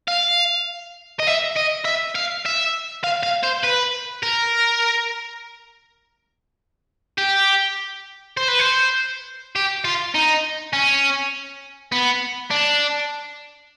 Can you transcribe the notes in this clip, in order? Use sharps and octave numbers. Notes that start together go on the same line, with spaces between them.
F5
D#5
E5
D#5
E5
F5
E5
F5
F5
C5
B4
A#4
G4
C5
B4
C5
G4
F4
D#4
C#4
B3
D4